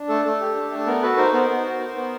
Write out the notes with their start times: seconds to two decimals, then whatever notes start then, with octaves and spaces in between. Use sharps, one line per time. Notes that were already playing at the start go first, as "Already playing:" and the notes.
Already playing: D4
0.09 A3 A4
0.25 A3 A4
0.41 G4
0.56 D4
0.71 A3
0.78 A4
0.87 B3 A#4
1.02 F#4 A4 B4
1.17 D#4 A#4 C5
1.33 B3 A#4 C5
1.49 B3
1.65 F#4
1.80 D#4
1.96 B3